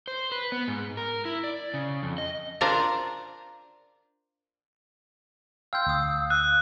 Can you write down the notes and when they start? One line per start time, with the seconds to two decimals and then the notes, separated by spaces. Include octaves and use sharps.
0.08 C5
0.32 B4
0.52 B3
0.68 G#2
0.97 A#4
1.25 E4
1.44 D5
1.74 C#3
2.03 F2
2.18 D#5
2.61 D4 F4 A#4 C5 D5 F5
5.73 F5 G5 C6 E6 G6
5.86 D2 F5 D#6 E6 G6
6.30 F#6